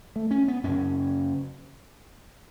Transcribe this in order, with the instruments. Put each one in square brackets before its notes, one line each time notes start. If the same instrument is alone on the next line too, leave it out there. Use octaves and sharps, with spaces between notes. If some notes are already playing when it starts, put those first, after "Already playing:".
[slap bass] A3
C#4
B3
F#2 C#3 C#4